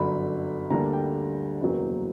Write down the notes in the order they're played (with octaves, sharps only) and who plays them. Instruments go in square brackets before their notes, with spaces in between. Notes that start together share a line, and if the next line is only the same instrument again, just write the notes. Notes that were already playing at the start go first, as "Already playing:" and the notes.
Already playing: [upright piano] G1 F#2 D3 F#3 B5
D2 D3 G3 A#3 D4 A#5
G5
F#1 E2 B2 F#3 A#3